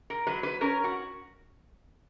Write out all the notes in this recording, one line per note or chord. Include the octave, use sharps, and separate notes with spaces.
A#4
F#3 B4
B4
C#4 A#4
F#4